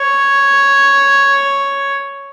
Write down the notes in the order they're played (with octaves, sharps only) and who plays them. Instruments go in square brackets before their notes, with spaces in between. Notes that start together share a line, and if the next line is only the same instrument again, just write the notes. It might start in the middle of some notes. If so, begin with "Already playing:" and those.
Already playing: [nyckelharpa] C#5